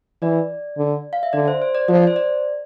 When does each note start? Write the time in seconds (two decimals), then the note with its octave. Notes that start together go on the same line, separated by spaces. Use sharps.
0.22 E3 D5
0.78 D3
1.13 F5
1.23 E5
1.33 D3 D5
1.48 C5
1.62 C5
1.75 D5
1.88 F3 D5
2.07 C5
2.16 D5